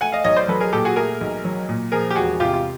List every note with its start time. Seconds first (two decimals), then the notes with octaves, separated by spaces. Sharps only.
0.01 A3 F#5 G#5
0.12 D#5 F5
0.24 B1 C#5 D#5
0.36 C5 D5
0.48 F#3 A4 B4
0.60 G#4 A#4
0.73 A#2 G4 A4
0.85 F#4 G#4
0.96 A3 G#4 A#4
1.21 B1
1.45 F#3
1.69 A#2
1.92 F3 G#4 A#4
2.11 G4
2.16 E1 F#4 G#4
2.40 C3 F4 G4
2.53 F4